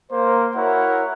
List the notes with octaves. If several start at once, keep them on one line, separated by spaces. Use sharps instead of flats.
A#3 A#4 C5
E4 F#4 A#4 C#5 F#5